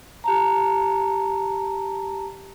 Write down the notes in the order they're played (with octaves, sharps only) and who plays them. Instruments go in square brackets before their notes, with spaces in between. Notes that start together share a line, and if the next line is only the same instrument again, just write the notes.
[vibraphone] G4 A5 A#5